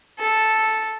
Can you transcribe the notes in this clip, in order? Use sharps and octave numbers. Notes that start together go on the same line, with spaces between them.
A4